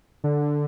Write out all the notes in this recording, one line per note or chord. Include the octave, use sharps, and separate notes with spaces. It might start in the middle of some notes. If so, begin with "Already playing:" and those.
D3